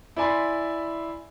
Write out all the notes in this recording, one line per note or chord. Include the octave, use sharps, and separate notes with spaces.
E4 D5 G#5 B5 C6